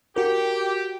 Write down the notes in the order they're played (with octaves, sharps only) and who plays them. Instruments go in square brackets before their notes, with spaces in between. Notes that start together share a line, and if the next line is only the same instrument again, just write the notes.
[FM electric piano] F#4 A#4 [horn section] G4